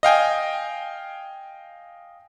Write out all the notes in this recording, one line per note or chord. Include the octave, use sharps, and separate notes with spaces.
D#5 F5 G5 G#5